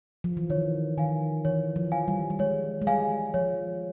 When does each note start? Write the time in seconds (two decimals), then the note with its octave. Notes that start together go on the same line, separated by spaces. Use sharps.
0.24 F3
0.37 E3
0.50 D#3 C#5
0.98 D#3 F5 G#5
1.45 E3 C#5
1.76 F3
1.92 F5 G#5
2.08 G3
2.30 G3
2.39 G#3 C#5
2.82 G#3
2.87 G3 F5 G#5
3.34 F3 C#5